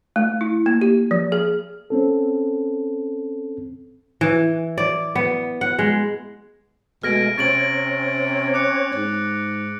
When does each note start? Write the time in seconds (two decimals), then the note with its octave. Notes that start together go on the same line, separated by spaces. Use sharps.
0.16 A3
0.41 E4
0.66 A#3
0.81 G4
1.11 F3
1.32 G#4
1.90 C4 C#4 A4
4.21 E3
4.78 D5
5.15 B3
5.61 F#5
5.79 G#3
7.03 B2 G#3 A3 G#5 F6 A#6 D7
7.38 C3 C4 C#4 C#5 A6 D7 F#7
8.54 D6 F#6 C#7
8.95 G#2